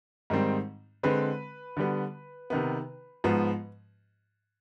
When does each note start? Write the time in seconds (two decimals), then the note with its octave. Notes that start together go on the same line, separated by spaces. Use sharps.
0.30 G#2 D#3 G3 C4
1.03 D3 G#3 C4 B4
1.77 D3 G3 B3
2.50 C3 D#3 B3
3.24 G#2 F3 B3